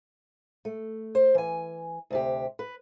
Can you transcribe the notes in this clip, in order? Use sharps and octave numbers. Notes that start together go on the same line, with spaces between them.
A3
C5
E3 G#5
D2 C3 G4
B4